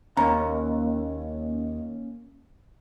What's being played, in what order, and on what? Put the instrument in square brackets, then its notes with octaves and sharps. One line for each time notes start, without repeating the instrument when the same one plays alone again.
[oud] D#2 [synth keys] A#3 C#4 [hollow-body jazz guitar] A#5